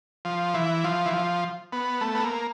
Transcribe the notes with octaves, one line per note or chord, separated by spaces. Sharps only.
F3
E3
F3
E3
F3
B3
A3
B3
A#3